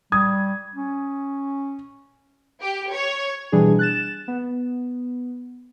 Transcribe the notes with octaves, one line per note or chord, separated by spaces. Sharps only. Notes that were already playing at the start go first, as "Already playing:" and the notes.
G3 D#6 G#6
C#4
G4
C#5
B2 E3 G3 D4 G#4
F#6 A6 E7
B3